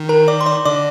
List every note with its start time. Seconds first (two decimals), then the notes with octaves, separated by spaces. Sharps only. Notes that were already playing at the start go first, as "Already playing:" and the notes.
Already playing: D#3
0.09 A#4 A#5
0.28 D5 D6
0.41 C6
0.46 D5 D6
0.65 D3 D5 D6